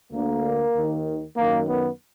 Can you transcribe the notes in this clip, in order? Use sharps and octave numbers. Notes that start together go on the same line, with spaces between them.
D2 D3 A#3
D#2 D#3
F#2 D#3 A#3
B3